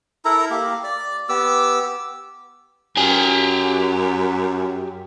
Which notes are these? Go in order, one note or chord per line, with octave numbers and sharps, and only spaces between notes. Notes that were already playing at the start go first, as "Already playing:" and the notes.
E4 A4 A#4 A#5
A#3 G4
D5
B3 G4 D6 E6
F#2 G4 G#5